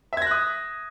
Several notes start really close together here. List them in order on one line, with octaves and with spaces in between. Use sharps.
E5 G#6 A#6 F#6 D#6